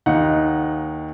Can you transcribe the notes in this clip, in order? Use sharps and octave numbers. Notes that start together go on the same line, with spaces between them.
D#2 D#4 F#5